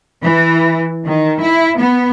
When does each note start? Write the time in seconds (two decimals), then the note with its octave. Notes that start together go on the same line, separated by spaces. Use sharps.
0.22 E3
1.06 D#3
1.41 E4
1.78 B3